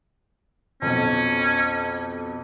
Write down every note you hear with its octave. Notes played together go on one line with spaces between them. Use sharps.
B1 F2 C#4